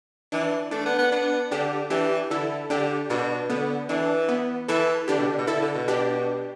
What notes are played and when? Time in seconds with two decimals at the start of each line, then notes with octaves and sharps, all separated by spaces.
0.32 E3 D4
0.71 A3 D4
0.86 B3
0.98 B3
1.11 B3 D4
1.51 D3 D4 G4
1.90 E3 D4 G4
2.30 D3 E4 A4
2.70 D3 D4 G4
3.10 B2 D4
3.49 D3 B3
3.89 E3 D4
4.28 B3
4.68 E3 E4 A4
5.08 D3 D4 G4
5.19 B2
5.28 D3
5.38 B2
5.47 D3 E4 A4
5.61 D3
5.74 B2
5.88 D4 G4